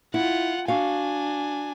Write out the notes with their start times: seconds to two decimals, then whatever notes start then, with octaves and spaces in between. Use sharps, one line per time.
0.14 E4 F4 F#5
0.68 D4 F#4 F5 G#5